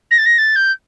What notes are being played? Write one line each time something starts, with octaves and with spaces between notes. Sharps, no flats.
A#6
A6
A#6
A6
G6